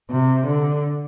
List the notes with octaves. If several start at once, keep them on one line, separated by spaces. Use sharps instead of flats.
C3
D3